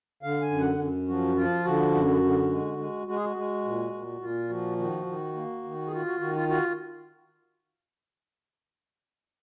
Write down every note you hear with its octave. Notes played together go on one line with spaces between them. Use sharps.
D3 F5
G#5
F#2
F#5
F#2
F3 F#4
F3 F4
D3 F#4
F#2
D3
G#3
G#3
G#3 F#4
G#4
F#4
G#3
A#2
A#2
A#2 F4
F3 F#4
D#3 F#4
D#3
A#3
D#3
G#4
F4 F#4
F#4
D#3 F#4
F4
F4 F#4